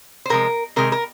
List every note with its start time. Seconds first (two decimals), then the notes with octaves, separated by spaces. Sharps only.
0.25 C5
0.30 C3 F3 G#3 A#4
0.76 C3 D#3 G#3 A#4
0.92 A#4